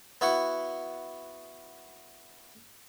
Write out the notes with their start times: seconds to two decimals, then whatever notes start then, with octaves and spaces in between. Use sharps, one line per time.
0.21 B3 E4 F#4 C#6